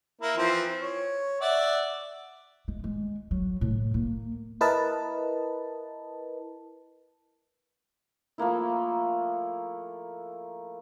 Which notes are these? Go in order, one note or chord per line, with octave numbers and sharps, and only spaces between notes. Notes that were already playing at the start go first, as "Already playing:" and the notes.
A#3 E4
E3 F3 C4
C#5
D5 E5 F#5
G#3
G#3
F#3
A2
A#3
E4 A#4 B4 D#5 A5
F3 A3 A#3 E4